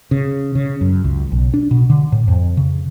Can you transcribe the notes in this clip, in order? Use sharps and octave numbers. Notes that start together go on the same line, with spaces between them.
C#3
C#3
F#2
C#2
B1
D4
B2
D3
A2
F2
C#3